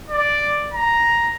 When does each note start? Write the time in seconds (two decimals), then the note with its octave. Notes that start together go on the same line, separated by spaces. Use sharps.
0.10 D5
0.73 A#5